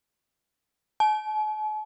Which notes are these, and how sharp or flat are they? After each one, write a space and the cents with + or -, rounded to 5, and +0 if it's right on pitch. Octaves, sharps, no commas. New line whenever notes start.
A5 -45